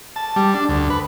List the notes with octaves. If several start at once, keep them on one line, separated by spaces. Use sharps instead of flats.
A5
G3
D4
D2
B4